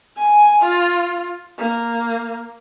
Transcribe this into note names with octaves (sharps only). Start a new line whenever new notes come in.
G#5
F4
A#3